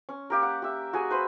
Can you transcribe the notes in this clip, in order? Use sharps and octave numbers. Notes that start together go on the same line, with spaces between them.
C#4
A#3 G4 A#4
F#5
G4 E5
F#4 G#4 G#5
B4 C5 B5